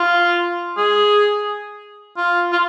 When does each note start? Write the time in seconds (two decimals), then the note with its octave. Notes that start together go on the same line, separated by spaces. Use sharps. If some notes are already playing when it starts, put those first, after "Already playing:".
Already playing: F4
0.77 G#4
2.17 F4
2.52 F4